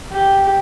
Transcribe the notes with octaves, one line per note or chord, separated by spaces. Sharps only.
G4